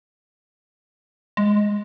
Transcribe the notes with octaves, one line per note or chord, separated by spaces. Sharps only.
G#3